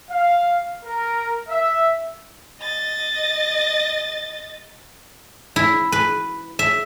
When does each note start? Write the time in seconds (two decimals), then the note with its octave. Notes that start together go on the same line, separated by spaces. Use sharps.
0.11 F5
0.85 A#4
1.49 E5
2.61 D#5 A6
5.56 E4
5.92 B4
6.59 E5